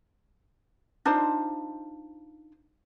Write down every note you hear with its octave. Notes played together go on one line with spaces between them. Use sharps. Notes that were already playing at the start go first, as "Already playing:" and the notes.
D4 D#4 F4 C5